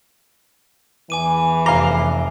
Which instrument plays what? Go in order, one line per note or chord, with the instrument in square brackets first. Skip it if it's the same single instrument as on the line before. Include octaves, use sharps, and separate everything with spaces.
[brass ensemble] E2 E3 [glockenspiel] G#5 D6 D#7
[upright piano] F1 D6 [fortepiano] F5 A#5 [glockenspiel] C7 G7